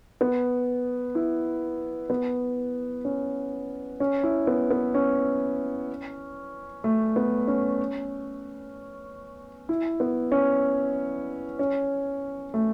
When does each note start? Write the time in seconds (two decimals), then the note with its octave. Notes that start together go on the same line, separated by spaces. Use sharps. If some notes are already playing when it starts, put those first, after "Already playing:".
0.21 B3
1.15 E4
2.10 B3
3.05 C#4
4.00 C#4
4.23 E4
4.47 B3
4.70 B3
4.95 C#4
6.84 A3
7.16 B3
7.48 C#4
9.69 E4
10.00 B3
10.32 C#4
11.59 C#4
12.54 A3